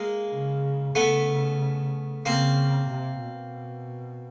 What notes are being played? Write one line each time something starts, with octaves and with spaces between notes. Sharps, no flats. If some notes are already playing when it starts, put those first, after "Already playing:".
Already playing: G#3 A#3
C#3
C#3 A3 B3
C#3 A#3 C4
C3
B2